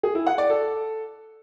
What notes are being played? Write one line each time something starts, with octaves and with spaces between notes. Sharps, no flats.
G#4
E4
F#5
D5
A4